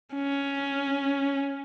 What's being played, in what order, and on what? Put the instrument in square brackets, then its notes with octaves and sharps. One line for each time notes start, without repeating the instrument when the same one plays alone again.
[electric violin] C#4